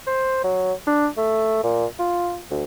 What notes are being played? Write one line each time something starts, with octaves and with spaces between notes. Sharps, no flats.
C5
F#3
D4
A3
A#2
F4
D2